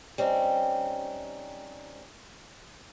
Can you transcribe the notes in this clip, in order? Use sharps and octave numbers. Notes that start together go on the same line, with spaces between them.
G3 C4 C#4 D#4